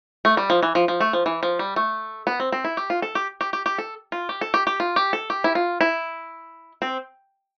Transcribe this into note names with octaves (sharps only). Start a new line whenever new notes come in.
A3
G3
F3
E3
F3
F3
A3
F3
E3
F3
G3
A3
B3
C4
C4
E4
G4
F4
A4
G4
G4
G4
G4
A4
F4
G4
A4
G4
G4
F4
G4
A4
G4
E4
F4
E4
C4